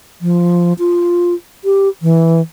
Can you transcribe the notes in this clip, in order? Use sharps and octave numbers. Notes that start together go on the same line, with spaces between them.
F3
F4
G4
E3